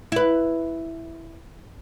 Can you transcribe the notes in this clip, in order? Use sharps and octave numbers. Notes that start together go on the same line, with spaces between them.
E4 B4